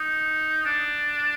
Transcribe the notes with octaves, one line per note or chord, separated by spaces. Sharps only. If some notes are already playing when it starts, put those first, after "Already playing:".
Already playing: D#4
D4